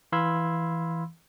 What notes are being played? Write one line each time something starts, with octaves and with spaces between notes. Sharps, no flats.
E3 F5 B5 C6 E6 G#6